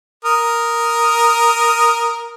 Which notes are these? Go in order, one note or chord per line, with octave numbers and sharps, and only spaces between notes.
A#4 D#6